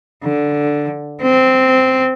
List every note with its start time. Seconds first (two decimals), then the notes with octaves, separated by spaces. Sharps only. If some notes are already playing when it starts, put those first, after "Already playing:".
0.24 D3
1.22 C4